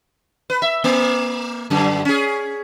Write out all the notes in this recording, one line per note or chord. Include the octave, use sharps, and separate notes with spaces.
B4
E5
A#3
F#2 D3
C#4 G#4